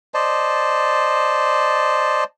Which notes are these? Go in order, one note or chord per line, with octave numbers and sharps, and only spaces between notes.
C5 D5 D#5 A5